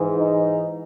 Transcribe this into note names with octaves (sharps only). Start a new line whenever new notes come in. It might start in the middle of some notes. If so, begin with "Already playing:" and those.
Already playing: G#2 E3
D#4